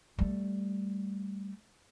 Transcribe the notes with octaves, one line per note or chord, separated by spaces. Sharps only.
G3 A3